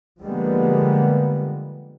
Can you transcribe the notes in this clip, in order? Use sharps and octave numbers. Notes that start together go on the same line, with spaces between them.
D3 F3 G3 G#3 A#3 B3